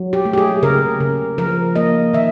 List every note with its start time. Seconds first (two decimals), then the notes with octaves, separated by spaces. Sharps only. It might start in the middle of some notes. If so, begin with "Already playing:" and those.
Already playing: F#3
0.13 G4
0.25 A3
0.33 G4
0.38 G#4
0.63 C#3 A#4
1.00 C#3
1.38 F3 A#4
1.76 A#3 D#5
2.13 D#3 E5